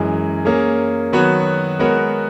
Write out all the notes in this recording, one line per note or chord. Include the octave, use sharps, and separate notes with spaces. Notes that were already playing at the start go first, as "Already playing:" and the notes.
Already playing: F#2 E3 G#3
A#3 C#4 G#4
D#3 F#3 B3 F#4 C#5
G#3 B3 F#4 A#4 C#5